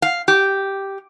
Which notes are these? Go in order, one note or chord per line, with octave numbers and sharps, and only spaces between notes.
F5
G4